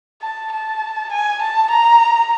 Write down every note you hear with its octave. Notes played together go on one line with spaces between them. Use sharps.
A5
A5
G#5
A5
A#5